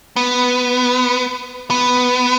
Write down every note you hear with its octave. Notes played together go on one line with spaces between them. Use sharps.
B3
B3